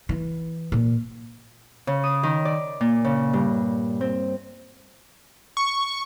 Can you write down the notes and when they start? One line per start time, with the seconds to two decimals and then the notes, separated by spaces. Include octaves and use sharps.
0.09 E3
0.72 A#2
1.87 C#3
2.04 D#6
2.23 D#3
2.45 D5
2.81 A#2
3.04 C#3
3.33 G2
4.01 C4
5.57 C#6